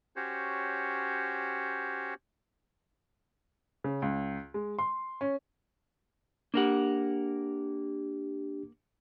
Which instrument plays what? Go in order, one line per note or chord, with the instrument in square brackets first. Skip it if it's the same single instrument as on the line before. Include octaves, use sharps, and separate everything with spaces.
[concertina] C#4 F#4 G4 C5 C#5
[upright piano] C#3
C#2
G#3
C6
C#4
[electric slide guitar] A#3 A#4 F#5 [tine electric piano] D4 G4